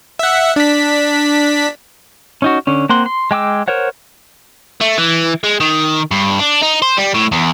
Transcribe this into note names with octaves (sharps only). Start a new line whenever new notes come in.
E5 F#5
D4 B6
C#4 D#4 F#4
D3 C#4
A#3 C4 F#5 C6
C6
G#3 G5 D6 E6
A#4 C5 C#5 F#5
A3
E3
G#3
D#3
G2
D4
D#4
C5
G3
A2
E2